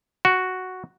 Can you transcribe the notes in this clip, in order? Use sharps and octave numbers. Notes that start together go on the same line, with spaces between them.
F#4